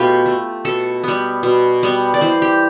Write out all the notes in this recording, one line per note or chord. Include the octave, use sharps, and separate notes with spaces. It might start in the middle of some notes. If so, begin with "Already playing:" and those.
Already playing: B2 A3 F4 G4
A3
B2 A4
G3 B3
B2
G3 B3
D5
E3 C5
G4